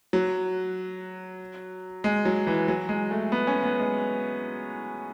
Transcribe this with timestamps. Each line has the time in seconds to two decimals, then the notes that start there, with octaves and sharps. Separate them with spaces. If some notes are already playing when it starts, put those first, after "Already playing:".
0.13 F#3
2.04 G#3
2.25 F#3
2.47 E3
2.68 F#3
2.89 G#3
3.11 A3
3.32 B3
3.47 C#4
3.64 B3
3.80 G#3